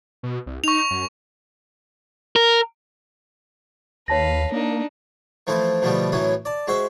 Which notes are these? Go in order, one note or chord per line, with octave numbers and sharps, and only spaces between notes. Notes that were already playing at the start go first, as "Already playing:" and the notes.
B2
C2
D#4 C#6 F7
F#2
A#4
D#2 B4 C#5 F5 A5 A#6
A#3 D4 D#4
E3 F3 A3 C4 E4
B2 D3 F3 G3 A3 B3
F#2 A2 E3 F#3 B3 C#4
D5 A5
G#3 F#4 C5 E5